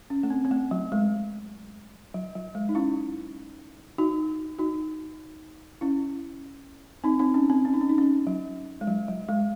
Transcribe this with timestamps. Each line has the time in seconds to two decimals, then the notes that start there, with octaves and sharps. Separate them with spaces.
0.10 C#4
0.23 A3
0.30 C4
0.45 C4
0.51 A3
0.71 F#3
0.92 G#3
2.14 F#3
2.35 F#3
2.55 G#3
2.69 D#4
2.75 C#4 E4
3.98 D#4 F#4
4.59 D#4 F#4
5.81 C#4 E4
7.04 C4 D#4
7.19 C4 D#4
7.34 C#4
7.50 C4
7.65 C#4
7.74 D#4
7.81 C#4
7.89 D#4
7.98 C#4
8.27 F#3
8.81 G#3
8.87 F#3
9.08 F#3
9.28 G#3